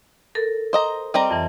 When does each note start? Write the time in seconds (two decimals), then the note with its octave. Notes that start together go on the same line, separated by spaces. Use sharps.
0.35 A4 A#4
0.73 C5 D#5 A#5
1.14 G3 C4 D#5 A#5 A#6
1.31 F2 E3